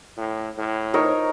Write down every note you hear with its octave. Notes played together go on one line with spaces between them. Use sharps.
A2
A2
D#4 A#4 C#5